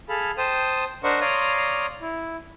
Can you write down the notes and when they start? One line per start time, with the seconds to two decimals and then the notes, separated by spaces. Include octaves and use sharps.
0.09 G#4 A4 F5 B5
0.38 C5 G5 A5 D#6
1.03 D4 A#4 C5 D#5 F#5 C#6
1.21 C#5 D5 F5 A#5 C6 D#6
2.01 E4